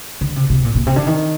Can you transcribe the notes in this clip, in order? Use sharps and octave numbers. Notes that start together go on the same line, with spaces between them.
D3
C3
C3
A#2
A#2
C3
D3
D#3